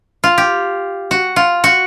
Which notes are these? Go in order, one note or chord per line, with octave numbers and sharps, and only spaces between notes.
F4
G4
F#4
F4
F#4